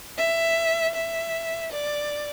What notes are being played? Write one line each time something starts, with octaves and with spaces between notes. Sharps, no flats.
E5
E5
D5